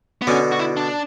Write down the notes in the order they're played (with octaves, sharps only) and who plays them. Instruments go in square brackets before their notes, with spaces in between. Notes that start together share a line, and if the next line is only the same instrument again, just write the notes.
[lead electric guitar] B3
[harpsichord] B2 D3 [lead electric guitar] C#4
[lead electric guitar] F#4
E4
D4